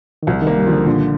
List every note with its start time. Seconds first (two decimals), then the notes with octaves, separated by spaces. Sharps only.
0.23 D#3
0.27 C2 F3
0.42 D#3
0.47 A#3
0.57 G3
0.67 F3
0.72 D3
0.86 A#2 D3